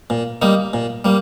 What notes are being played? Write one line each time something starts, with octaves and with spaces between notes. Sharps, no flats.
A#2
G3 A#3 D#4
A#2
G3 A#3